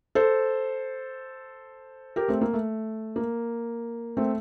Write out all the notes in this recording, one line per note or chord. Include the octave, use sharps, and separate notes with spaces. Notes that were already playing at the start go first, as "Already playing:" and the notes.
A4 C5
G4 A#4
A3 C4
A#3
A3
A#3
A3 C4